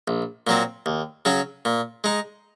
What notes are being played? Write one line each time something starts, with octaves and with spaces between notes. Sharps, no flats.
A#1
A#2 F#3 C4
D#2
C#3 F#3 C#4
A#2
G#3 D#4